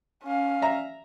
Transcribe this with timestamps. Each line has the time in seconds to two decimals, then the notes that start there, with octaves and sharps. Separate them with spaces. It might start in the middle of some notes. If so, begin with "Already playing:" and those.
0.24 C#4 F5
0.62 E5 A#5